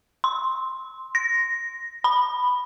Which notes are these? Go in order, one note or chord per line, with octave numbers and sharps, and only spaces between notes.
C6
A#6
B5